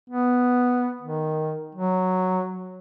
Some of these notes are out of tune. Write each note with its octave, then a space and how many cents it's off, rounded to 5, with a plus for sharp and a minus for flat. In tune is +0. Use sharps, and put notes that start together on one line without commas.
B3 +0
D#3 +0
F#3 +0